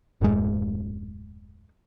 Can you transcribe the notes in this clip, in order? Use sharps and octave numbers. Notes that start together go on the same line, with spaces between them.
D#1 F#2 A2 G#3